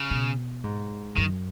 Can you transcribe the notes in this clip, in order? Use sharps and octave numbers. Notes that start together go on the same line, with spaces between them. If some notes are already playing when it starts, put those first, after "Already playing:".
Already playing: C#3
B2
G#2
F#2 D#3